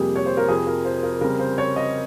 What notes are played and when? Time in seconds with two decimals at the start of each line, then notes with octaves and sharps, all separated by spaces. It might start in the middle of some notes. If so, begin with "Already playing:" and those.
Already playing: F2 C3 G3 A#3 G4 G#4
0.16 C#5
0.26 C5
0.37 A#4
0.48 F2 C3 F3 G#4
0.67 A#4
0.85 C5
1.03 A#4
1.21 C#3 G3 C4 A#4
1.39 C5
1.58 C#5
1.76 D#5